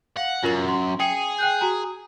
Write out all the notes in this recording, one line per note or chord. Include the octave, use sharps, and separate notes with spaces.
F5 F#5
F#2 F4 A#4 F#7
C6
G#4 G5 D#6 C#7
G5 F#6 G6
F#4 G#5 A#5